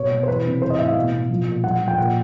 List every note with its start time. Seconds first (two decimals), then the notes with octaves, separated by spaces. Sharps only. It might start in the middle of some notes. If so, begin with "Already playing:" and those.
Already playing: B2 C#5
0.11 B2
0.23 C5
0.28 E3 B4
0.45 C3
0.62 E3 C5
0.70 D#5
0.79 A2 E5
0.87 F5
0.96 B2
1.13 B2
1.30 F3
1.47 A#2
1.64 F3 F#5
1.81 F3
1.88 G5
1.98 A#2 F#5